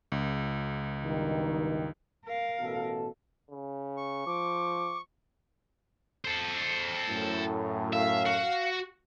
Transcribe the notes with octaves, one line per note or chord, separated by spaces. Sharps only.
C#2
G2 B2 D#3
A#4 F5
A1 B2 A4
C#3
C#6
F3 D6
A4 C5
F#2 A2
E5 F5
F#4